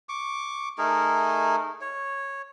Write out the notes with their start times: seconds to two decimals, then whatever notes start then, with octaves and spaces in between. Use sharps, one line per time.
0.09 C#6 D6
0.78 A3 D#4 G#4 A#4
1.81 C#5